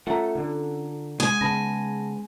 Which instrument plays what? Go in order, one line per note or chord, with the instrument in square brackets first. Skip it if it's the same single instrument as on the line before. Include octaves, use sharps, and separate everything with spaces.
[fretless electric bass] A3 [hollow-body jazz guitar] C#4 A4 F#5 [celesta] F4 A#5
[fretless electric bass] D3
[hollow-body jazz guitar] G#3 [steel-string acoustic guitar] G#5 [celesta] D#6
[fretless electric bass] C#3 B3 [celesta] A5 B5 A#6